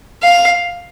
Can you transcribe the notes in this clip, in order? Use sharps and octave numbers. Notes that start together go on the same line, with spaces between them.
F5